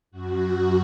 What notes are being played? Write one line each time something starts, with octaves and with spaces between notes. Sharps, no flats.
F#2 F#4